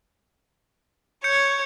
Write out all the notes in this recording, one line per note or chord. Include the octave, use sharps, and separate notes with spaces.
C#5 G6 C#7